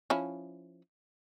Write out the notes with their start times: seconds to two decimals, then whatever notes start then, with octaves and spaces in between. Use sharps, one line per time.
0.10 F3 C#4 E4